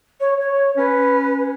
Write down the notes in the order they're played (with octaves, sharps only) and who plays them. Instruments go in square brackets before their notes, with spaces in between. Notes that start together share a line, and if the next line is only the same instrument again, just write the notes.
[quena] C#5
C#5
[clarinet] C#4 [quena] B4